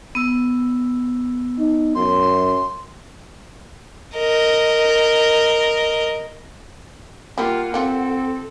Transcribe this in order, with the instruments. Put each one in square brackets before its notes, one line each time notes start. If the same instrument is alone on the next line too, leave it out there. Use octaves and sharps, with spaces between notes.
[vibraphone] B3 E6
[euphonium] D#4
[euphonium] F#2 [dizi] C6
[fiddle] A#4 D#5
[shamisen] G3 G4 [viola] A#3 F4 [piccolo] F#5
[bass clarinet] C4 [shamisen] F4 G4 [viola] A4